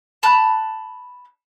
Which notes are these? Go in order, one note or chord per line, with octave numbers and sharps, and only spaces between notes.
A5 B5 F#6